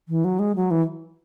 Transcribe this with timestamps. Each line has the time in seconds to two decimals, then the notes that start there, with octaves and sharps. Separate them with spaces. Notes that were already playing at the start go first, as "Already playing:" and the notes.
0.09 E3
0.24 F#3
0.39 G#3
0.56 F#3
0.71 E3